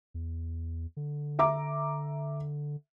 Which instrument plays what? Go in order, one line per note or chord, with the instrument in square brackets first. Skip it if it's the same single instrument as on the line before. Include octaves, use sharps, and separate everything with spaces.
[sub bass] E2
D3
[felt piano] E5 A#5 D6